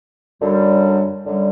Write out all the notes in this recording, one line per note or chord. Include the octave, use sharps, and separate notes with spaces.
F#2 D3 G3
F#2 D3 G3